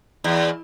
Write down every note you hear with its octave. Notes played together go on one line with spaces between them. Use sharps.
E2